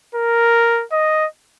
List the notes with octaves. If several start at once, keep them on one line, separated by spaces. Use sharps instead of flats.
A#4
D#5